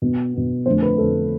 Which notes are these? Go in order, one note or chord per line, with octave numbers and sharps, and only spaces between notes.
B2 B3
B2 B3
F2 D3 A3 C5
B4
F2 D3 A3 A4